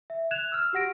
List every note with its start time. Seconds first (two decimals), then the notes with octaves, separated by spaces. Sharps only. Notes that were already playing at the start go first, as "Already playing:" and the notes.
0.10 E5
0.31 F#6 G#6 E7 F7
0.52 E6 F6
0.73 F#4 G4 F#5 A#6 D7